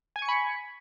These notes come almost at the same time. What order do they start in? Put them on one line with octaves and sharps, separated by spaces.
G#5 G#6 C#6 C#7 B5